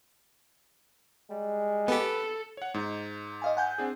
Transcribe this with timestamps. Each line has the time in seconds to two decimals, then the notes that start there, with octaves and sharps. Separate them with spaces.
1.30 G3 G#3
1.88 B3 G4 A4 B4
2.57 C#5 F#5
2.74 G#2 D#4
3.42 D#5 F5 G#5
3.57 F#5 G#5 G6
3.78 C4 D4 G#4